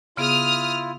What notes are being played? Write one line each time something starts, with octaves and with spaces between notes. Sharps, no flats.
C#3 B3 E4 F4 G#4 D#6 F6